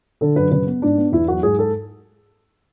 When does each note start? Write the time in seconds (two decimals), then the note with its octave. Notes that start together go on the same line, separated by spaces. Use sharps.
0.21 D3 A4
0.36 F#2 B4
0.51 C#3 B4
0.67 B3
0.82 G#2 D4
0.97 B3
1.12 E2 E4
1.28 F#3 F#4
1.43 G#2 G#4
1.59 A4